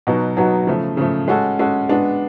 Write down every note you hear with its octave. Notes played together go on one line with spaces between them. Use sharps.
B2 F#3 B3 D#4 F#4
B2 F#3 B3 D#4 F#4
C#3 F3 A3
C#3 F3 A3
G#3 C#4 F#4 A4
G#3 C#4 F#4 A4
G#3 B3 D4 F#4